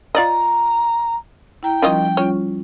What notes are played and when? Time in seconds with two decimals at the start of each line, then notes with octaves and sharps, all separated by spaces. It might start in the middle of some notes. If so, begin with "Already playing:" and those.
0.15 F4 D5 D#5 A#5
1.63 E4 G5 A#5
1.82 D#3 F3 G3 C#4 F4 D#5
2.17 G3 C#4 F4 C#5